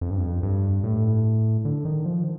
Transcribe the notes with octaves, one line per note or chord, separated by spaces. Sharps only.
F2
G2
F2
G2
A2
D3
D#3
F3